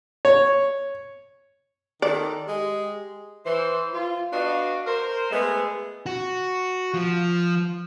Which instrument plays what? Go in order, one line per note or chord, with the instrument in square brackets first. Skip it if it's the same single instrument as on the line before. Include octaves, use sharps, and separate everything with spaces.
[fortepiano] C#5
[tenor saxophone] D#3 [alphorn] A4 [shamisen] D5
[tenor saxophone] G#3 [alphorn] G4
[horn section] E3 C5
F4
B3 D4 F#4 D#5 F5
A#4 C5
G#3 A3 B3 G#4
[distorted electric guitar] F#4
F3